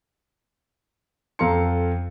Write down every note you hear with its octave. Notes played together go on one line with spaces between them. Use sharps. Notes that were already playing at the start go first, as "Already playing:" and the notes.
F2 A4 F5 A#5 C6 C#7